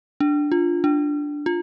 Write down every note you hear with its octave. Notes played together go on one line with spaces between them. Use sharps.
D4
F4
D4
F4